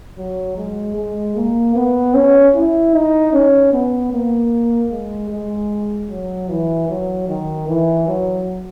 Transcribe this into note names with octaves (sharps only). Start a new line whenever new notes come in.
F#3
G#3
G#3
A#3
B3
C#4
E4
D#4
C#4
B3
A#3
G#3
G#3
F#3
E3
F#3
D#3
E3
F#3